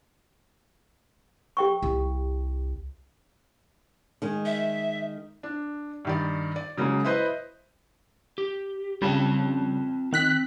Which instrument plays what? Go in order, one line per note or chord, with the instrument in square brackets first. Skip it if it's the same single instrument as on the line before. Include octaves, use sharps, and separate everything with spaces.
[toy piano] G4 G5 C#6
[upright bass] C2
[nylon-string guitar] D#3 G#3
[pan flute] E5
[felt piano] D4
G2 D#3 D5
D5
C#3 F#3 G#3 A#3
E4 B4 C5 D#5
[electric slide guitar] G4
[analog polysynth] C#3 G3 [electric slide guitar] C4 F4 A5
[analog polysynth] D#3 F#6 B6 [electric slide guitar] C4